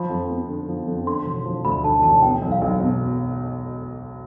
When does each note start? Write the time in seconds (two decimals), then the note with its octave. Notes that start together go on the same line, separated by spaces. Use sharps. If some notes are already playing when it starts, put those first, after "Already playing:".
Already playing: F3 B5
0.10 F2
0.29 B3
0.48 D3
0.68 F3
0.87 F2
1.06 D3 C6
1.25 E1
1.45 F3
1.65 D2 B5
1.84 D3 A5
2.03 E1 A5
2.22 B3 G5
2.42 B1
2.52 F5
2.61 B1
2.81 B2